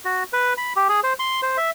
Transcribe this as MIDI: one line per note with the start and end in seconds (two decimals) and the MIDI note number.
0.05 0.23 66
0.33 0.53 71
0.58 0.73 83
0.76 0.88 67
0.89 1.00 68
1.04 1.13 72
1.19 1.41 84
1.42 1.57 72
1.57 1.70 76